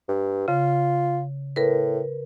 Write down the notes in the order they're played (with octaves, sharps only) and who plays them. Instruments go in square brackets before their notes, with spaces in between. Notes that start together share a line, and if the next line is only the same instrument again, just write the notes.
[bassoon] G2
[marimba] C#3 [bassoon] F4
[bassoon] A2 [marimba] A#4 B4